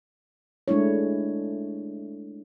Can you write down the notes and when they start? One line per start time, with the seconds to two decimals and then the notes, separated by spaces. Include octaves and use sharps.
0.68 G#3 A3 D4 E4 C#5